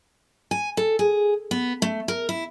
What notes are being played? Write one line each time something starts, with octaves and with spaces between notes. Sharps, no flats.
G#5
A4
G#4
B3
A3
A#4
E4